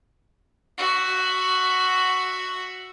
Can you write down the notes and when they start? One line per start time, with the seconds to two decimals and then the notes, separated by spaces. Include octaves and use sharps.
0.78 F#4 E5